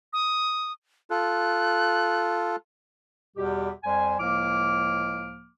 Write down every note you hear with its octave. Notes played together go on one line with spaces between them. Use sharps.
D#6
F4 A4 F#6
E2 B2 G3 G4
F2 G3 C5 G#5
C#2 A2 F3 A#3 D6 F6